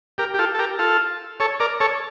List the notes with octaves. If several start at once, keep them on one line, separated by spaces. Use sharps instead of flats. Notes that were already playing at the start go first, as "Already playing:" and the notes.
G4 A#4
G4
F4 A4
A4
G4 A#4
F4 A4
A4 C#5
A#4 D5
A4 C#5